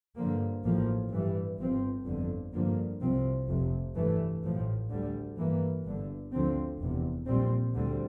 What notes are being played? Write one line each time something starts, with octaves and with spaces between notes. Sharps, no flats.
G2 D3 F3 A#3
A1 A2 F3 A#3
G2 E3 G3
G1 G2 F3 C4
G1 F2 D3
G2 D3 F3 A#3
C2 C3 F3 C4
F1 F2 C3
G2 E3 A3
A1 A2 F3
D2 D3 G3
G2 E3 A#3
G1 G2 D3
D2 D3 F3 C4
F1 E2 C3
A#1 A#2 G3 C4
D2 D3 G3 C4